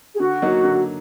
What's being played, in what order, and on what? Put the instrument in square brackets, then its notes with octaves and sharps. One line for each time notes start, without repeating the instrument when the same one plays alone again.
[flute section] G#4
[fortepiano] D3 [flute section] F#4
[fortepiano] F#3 A#3 D#4
D3